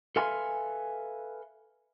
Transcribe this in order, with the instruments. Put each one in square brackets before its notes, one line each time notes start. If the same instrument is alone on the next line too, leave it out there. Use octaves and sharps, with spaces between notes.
[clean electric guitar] A4 B4 E5 F5 G#5 C6